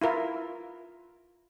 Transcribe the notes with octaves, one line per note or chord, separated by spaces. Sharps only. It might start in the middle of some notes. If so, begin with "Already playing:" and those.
E4 F4 A#4